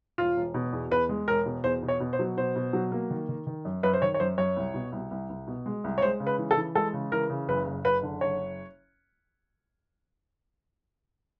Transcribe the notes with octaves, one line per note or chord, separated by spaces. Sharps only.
E1 F4
E1
B2
E2
E2 B4
G#3
E1 A#4
B2
E2 C5
B2
C#5
B2
C5
F#3
B2 C5
B2
F#3
A#3
D#3
D#3
D#3
F#2
F#2 B4
C5
D#3 C#5
C#5
F#2 C5
F#2 C#5
C2
B2
C2
C2
C2
B2
G#3
C2
C#5
G#3 C5
C#3
B4
E3
A4
E3
G#3 A4
C#3
E3 A#4
C#3
F#1 B4
F#1
F#1 B4
D3
F#1 C#5